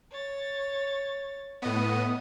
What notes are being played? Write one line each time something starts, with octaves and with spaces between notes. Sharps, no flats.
C#5 A6
A2 B3 D#5